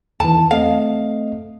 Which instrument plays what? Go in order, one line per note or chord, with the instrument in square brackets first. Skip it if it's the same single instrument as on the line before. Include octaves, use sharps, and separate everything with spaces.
[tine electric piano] E2 D#3 E3 [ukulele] A5
[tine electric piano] A3 C4 D#5 [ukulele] F5